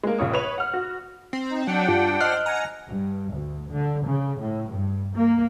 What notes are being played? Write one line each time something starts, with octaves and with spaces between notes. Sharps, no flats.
G#3 A#3
A#1 C#3 F4 C#5 D#6
B4 C#5 F7
F#5 F6
F#4
C4
D#4
F#3 D4 F#5 G5
G2 F4
C5 D#5 F6 F#6
F#5 G#5 A#5
G2
D2
D3
C#3
A2
G2
A#3